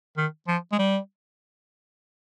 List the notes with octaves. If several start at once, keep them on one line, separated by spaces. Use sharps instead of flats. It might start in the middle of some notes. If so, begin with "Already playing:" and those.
D#3
F3
G#3
G3